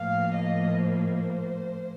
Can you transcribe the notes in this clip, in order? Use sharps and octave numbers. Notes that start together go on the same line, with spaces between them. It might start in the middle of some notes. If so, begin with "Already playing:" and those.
Already playing: A2 F3 A#3 F5
D#5
C5